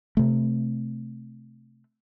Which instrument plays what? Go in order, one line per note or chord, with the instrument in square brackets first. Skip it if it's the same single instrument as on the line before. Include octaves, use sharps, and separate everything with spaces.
[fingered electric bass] C3 A3